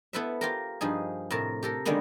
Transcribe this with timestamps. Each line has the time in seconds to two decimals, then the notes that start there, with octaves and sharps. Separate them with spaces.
0.13 B3 E4 A4 B4 C5 E5
0.41 F4 G4 A#4
0.81 G2 F3 D#4 G#4
1.31 A2 C3 A#4 A5
1.63 G4 A4 A#4
1.85 D3 D#3 G3 G#3 A#3 B3